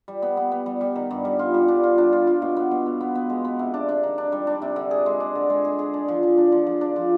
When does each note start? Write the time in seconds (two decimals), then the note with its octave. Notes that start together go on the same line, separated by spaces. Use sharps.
0.08 G3
0.22 B3
0.37 B3
0.52 B3
0.66 G3
0.81 G3
0.96 D#3
1.11 G2
1.25 G3
1.39 F4
1.54 G3
1.68 D4
1.83 F4
1.98 D4
2.13 F4
2.27 F4
2.42 B2
2.57 B3
2.71 B2
2.86 B3
3.01 B3
3.15 B3
3.30 G#3
3.45 B3
3.59 C3
3.74 D4
3.89 D4
4.03 D#3
4.18 D4
4.32 G3
4.47 D4
4.62 C3
4.76 D3
4.91 G#4
5.06 G#3
5.20 D4
5.35 D3
5.50 G#3
5.64 G#4
5.79 G#4
5.94 D4
6.08 F3
6.23 F3
6.38 D4
6.52 F3
6.67 F3
6.81 D4
6.96 F3